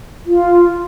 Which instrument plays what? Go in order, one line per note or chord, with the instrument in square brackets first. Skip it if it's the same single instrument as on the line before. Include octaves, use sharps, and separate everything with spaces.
[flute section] F4